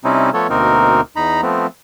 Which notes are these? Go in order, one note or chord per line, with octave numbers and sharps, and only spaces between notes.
C3 G3 C4 C#4 D#4 E4
F3 A3 B3 A4 C#5
D2 B2 A#3 C4 D#4 A#4
E2 D#4 A#5 B5
F3 A3 B3 C4